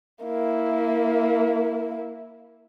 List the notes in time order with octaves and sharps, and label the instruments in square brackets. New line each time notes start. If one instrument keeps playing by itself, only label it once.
[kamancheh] A#3 E4